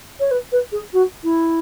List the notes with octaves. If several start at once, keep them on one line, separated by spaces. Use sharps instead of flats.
C#5
B4
B4
G#4
F#4
E4